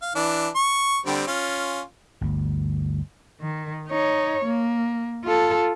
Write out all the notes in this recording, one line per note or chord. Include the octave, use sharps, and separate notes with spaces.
F5
E3 D4
C#6
D3 G3 C4
C#4 F4
G1 D2
D#3
D#4 C#5
A#3
F4 A4